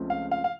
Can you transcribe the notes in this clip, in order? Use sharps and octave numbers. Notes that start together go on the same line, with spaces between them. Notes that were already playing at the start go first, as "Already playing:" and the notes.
Already playing: C#2 C#3 F3 A3 C4
F5
F5
F5